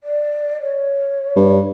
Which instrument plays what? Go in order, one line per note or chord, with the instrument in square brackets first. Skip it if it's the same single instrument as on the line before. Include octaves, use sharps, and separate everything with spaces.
[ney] D5
C#5
[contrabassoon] G2